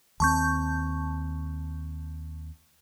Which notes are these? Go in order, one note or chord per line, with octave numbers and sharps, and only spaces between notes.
D#2 A3 C4 A5 C#6 G6